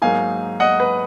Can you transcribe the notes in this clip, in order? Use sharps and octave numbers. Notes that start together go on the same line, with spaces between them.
G#2 F#3 A#3 D#4 F5 G#5
D#5 F#5
B4